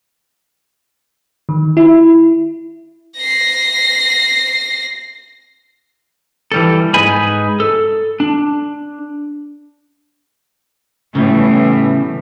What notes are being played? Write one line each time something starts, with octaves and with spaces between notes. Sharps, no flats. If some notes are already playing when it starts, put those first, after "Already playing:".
D#3
E4
A#6 C7
E3 G3 A4
G#2 D#4 G#4 B4 G#5 B5
A4
D4
A2 C#3 E3 G3 B3